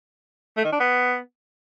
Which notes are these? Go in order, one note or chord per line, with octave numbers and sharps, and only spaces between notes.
A3
D#3
D4
B3